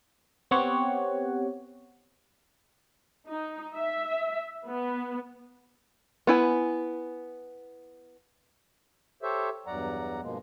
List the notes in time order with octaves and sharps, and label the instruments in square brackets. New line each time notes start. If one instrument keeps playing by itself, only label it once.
[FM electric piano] B3 C4 G4 C#5 F#5
[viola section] D#4
E5
B3
[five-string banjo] B3 E4 G#5
[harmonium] G4 A4 C5 C#5 E5
E2 G2 F#3 D5 F#5 A#5
G2 B2 F3 G#3 A#3